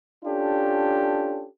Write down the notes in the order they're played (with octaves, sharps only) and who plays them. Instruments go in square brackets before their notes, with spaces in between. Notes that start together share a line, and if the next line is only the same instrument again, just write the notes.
[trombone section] C#4 D4 F4 G4 A4